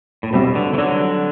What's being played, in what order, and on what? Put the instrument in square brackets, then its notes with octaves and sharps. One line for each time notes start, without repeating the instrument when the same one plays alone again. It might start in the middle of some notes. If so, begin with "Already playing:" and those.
[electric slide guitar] A2
[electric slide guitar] B2 [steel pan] G3 C4 F#4
[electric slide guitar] D3
E3
D3 F#3